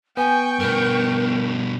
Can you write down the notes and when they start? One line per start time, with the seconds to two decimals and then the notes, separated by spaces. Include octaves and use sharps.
0.17 B3 G5 G#5 C#6
0.59 G2 B2 A#4